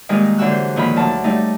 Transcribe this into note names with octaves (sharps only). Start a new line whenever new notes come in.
A#2 D#3 G3 G#3 D#4 G#4
D3 E3 F#3 F#4 E6 F#6
C5
A#2 D#3 F3 B5
D2 F#3 A5
G3 A3 D#4